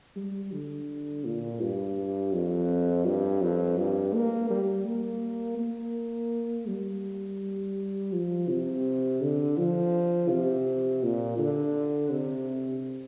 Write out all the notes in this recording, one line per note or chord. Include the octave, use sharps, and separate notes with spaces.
G3
D3
A#2
G2
F2
G2
F2
G2
A#3
G3
A#3
A#3
G3
F3
C3
D3
F3
C3
A#2
D3
C3